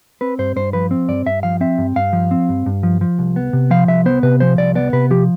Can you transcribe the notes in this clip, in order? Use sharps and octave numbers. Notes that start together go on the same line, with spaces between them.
C4 B4
G2 C5
G2 C5
F3 B4
C4
G2 D5
G2 E5
F3 F5
C4 E5
G2
G2 F5
F3
C4
G2
G2
F3
F3
C2
B3
C3
F3 F5
C2 E5
B3 C5
C3 B4
F3 C5
C2 D5
B3 D5
C3 B4
F3 G4